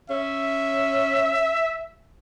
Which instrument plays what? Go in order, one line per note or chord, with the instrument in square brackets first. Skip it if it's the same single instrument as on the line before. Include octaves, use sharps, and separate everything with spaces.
[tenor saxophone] C#4 [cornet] E5